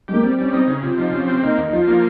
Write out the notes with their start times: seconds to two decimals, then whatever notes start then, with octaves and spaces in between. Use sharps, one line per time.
0.08 G#3 G4
0.13 A#3
0.23 G3 C4
0.39 G3 C#4
0.53 C4 D#4
0.68 C#3 C#4
0.83 C3 F4
0.98 F3 D#4
1.13 C3 C#4
1.27 C4
1.43 A#3 D#4
1.57 D#2
1.68 D#4
1.73 F3 F4
1.87 A#3 F4